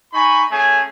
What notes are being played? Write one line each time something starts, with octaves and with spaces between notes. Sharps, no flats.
D#4 G#5 B5 C#6
A3 C#4 G#4 G#5